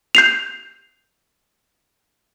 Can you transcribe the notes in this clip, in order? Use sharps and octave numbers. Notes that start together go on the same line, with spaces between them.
G6 C7 F7